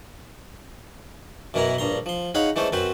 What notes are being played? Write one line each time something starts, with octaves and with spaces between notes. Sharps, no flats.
F#2 B2 E3 E4 A#4 A#5
A#1 G2 A#5 C6
F3 C6
D#4 G#4 C#5 F5 F#5 B5
E3 G#3 A3 C#4 A4 C5
F#2 F#3 C4 B4 C5